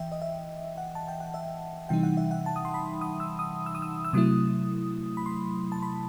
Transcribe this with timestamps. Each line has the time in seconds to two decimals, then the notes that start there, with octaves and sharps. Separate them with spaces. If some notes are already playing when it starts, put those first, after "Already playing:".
Already playing: E3 E5 G5
0.12 D#5
0.22 E5
0.78 F#5
0.95 A5
1.08 G5
1.20 F#5
1.34 E5
1.89 C3 E3 G3 D#4 G5
2.03 F#5
2.17 E5
2.31 F#5
2.46 A5
2.56 D#6
2.65 C6
2.74 B5
3.01 D#6
3.20 E6
3.39 D#6
3.66 E6
3.75 D#6
3.82 E6
4.05 E6
4.13 C3 F#3 A3 E4 D#6
5.17 B5
5.26 C6
5.72 A5
5.83 B5